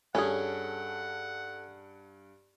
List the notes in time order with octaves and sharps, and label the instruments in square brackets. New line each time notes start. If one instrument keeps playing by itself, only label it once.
[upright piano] G2 [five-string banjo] C#4 G#4 [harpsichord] A4 [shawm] F#5